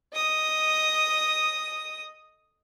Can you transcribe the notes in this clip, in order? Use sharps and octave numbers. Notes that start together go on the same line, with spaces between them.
D#5 D#6